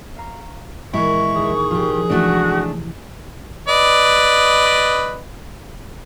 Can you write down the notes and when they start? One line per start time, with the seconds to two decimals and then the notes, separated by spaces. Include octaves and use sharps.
0.17 F5 A#5 C#6
0.93 A#2 E3 G#3 E4 C#6
1.36 D#2 G#4
1.71 C2 A#2 F3 F4 G4
2.10 E3 G#3 A3 D4 E4 F#4
3.68 B4 D5 D#5